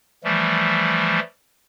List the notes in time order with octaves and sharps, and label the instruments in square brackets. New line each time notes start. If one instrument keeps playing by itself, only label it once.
[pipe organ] E3 F3 G3 A3